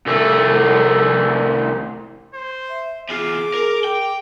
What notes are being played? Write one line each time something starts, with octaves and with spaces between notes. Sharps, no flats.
C2 A3
C5
E5
E2 F4 G#4 D6
A#4
G5